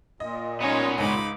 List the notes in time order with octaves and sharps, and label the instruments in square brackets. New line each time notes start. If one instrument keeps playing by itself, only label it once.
[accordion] A#2 [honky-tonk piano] D#5
[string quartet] G#3 C#4 D#4 [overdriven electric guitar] B3 C#5
[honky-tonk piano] C#2 G#2 [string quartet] D#4 B5 D6